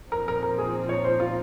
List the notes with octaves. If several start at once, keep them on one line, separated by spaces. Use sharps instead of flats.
A#2 F3 C4 D#4 A#4
A#4
A#4
G#4
C#5
C5
F4